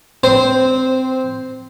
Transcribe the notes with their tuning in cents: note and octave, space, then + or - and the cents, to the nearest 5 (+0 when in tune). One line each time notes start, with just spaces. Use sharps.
C4 -10 C5 +0